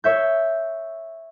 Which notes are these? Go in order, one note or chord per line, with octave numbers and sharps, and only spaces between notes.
C#5 E5 G6